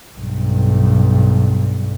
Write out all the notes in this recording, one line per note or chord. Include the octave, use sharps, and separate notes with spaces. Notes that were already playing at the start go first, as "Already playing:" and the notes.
B1 G2